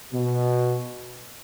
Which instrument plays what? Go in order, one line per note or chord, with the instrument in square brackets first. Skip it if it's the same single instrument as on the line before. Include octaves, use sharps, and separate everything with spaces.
[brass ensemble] B2